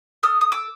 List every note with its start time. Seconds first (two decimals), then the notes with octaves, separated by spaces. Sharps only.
0.23 A4 D#6 F6
0.41 D#6
0.52 D6 E6